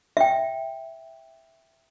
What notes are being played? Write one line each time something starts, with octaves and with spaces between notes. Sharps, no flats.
E5 G5